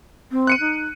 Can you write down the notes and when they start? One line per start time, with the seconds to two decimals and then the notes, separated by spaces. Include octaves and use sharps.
0.31 C4
0.47 F#6 C#7 D#7
0.60 D#4